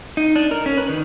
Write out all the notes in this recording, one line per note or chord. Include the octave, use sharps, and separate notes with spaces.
D#4
D4
A#4
C#4
B4
D#3